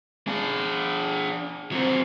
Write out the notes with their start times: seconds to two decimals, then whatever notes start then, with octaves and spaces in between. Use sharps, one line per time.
0.27 D4 G#4
1.72 F#3 C4